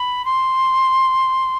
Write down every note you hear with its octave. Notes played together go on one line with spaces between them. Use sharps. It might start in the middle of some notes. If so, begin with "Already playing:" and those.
Already playing: B5
C6